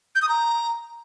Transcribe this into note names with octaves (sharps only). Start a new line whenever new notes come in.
G6
D#6
A#5